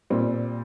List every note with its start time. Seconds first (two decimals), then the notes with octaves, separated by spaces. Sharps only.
0.10 A#2 G3 C4